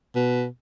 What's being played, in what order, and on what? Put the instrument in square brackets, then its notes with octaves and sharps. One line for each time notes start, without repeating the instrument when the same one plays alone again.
[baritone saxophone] B2